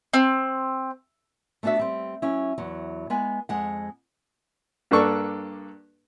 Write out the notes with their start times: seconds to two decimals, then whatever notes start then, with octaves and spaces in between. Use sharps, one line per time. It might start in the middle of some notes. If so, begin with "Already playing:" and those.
0.13 C4
1.63 A3 B3 D4 F#4 E5
1.79 G3 C4
2.22 F#3 C#4 E4
2.58 E2 F#3
3.10 G#3 B3 G#5
3.49 F2 G#3 F#5
4.91 G2 A#3 D4 A4 C#6